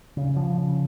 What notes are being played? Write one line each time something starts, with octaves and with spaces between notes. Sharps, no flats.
C#3
F3
C#3